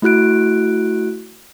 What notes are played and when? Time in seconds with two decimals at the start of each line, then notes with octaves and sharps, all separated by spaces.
0.02 A3 E4 F#4 F#6 D7